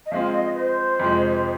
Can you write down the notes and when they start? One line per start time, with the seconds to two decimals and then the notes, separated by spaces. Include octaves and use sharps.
0.06 D#5
0.11 F3 G#3 C4 F5
0.33 D#5
0.55 C5
1.00 F2 C3 F3 G#3